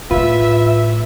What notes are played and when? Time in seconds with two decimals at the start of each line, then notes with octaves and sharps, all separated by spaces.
0.11 A2 F4 B4 E5